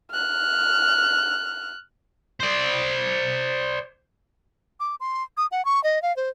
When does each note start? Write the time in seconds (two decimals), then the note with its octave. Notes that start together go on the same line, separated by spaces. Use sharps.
0.12 F6 F#6
2.40 C5 D5
4.80 D6
5.00 C6
5.37 D#6
5.51 F#5
5.65 C#6
5.84 D#5
6.02 F5
6.16 C5